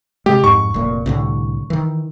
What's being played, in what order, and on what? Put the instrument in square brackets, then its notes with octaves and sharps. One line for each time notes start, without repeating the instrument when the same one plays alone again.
[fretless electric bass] C3 G#3 [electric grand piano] G4
[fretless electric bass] F2 G#2 [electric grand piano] C#6
[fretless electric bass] F1 A#2
C2 A2 D3
D#3 E3